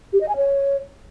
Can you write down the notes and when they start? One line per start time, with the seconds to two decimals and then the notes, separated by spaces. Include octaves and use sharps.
0.13 G4
0.21 D#5
0.28 G#5
0.36 C#5